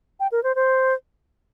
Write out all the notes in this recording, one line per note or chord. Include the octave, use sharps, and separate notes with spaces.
G5
A#4
C5
C5